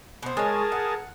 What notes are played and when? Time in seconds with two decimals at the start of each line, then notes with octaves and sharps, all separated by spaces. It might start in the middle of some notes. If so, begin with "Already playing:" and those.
0.22 B2 C4
0.37 G#3 G#4 A#4 C#5 A5
0.72 F#5